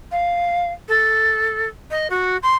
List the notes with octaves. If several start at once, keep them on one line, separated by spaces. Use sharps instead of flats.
F5
A4
D#5
F#4
C6